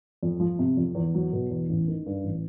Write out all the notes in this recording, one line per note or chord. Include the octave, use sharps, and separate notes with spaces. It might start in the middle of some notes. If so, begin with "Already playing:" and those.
F2
F3
C3
F2
E2
F#3
B2
E2
A1
D#3
G2
A1